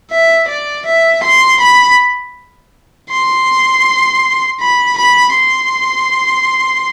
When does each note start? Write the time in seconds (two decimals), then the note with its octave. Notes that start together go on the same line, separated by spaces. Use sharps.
0.11 E5
0.48 D5
0.86 E5
1.23 C6
1.60 B5
3.10 C6
4.60 B5
4.97 B5
5.34 C6